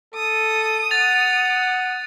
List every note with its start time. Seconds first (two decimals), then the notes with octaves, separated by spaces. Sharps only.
0.15 A4 D#6
0.91 F#5 A6 F7